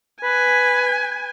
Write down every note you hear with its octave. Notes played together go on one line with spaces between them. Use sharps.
B4 G#5